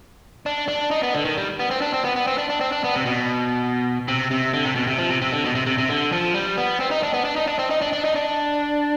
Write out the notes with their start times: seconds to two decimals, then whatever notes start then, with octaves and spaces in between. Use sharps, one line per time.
0.46 D4
0.68 D4
0.91 D#4
1.03 B3
1.14 D3
1.25 D#3
1.37 G3
1.59 B3
1.71 C4
1.82 D4
1.93 C4
2.04 B3
2.16 B3
2.27 C4
2.38 D4
2.50 D4
2.61 C4
2.72 D4
2.84 B3
2.95 C3
3.06 B2
4.08 C3
4.31 C3
4.54 D3
4.65 C3
4.76 B2
4.87 C3
4.98 F3
5.10 C3
5.22 C3
5.32 D3
5.44 B2
5.55 C3
5.67 C3
5.78 C3
5.89 D3
6.12 F3
6.34 G3
6.57 B3
6.80 C4
6.91 D#4
7.03 D4
7.14 B3
7.25 D4
7.36 D#4
7.47 D4
7.59 C4
7.71 D#4
7.82 D4
7.93 D4
8.05 D#4
8.16 D4